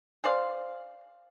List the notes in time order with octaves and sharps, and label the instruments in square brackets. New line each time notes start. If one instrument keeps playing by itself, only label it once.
[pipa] G#4 C5 D5 F5